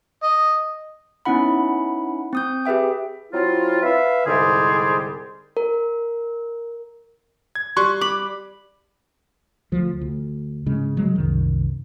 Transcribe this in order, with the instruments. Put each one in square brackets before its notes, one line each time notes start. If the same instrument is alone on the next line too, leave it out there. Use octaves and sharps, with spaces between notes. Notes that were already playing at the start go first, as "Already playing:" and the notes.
[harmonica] D#5
[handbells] B3 C#4 D#4 E4 F#5 B5
C4 D#6 G6
G4 G#4 B4 E5 G5
[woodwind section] F#3 C4 E4 F4
B4 E5 F5
C2 G#2 D3 G3 G#4 C6
[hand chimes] A#4
[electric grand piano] G#6
[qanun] G3 [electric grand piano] C6 C#6 F#6
[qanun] B5 [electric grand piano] D6
[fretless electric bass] D2 F3
D2
G#1 C#3 G#3 C#4
C#3 F#3 G#3
C2 F#2 D#3